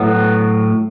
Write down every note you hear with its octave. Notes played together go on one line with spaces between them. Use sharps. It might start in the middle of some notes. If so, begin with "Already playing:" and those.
Already playing: A2 F#3 B3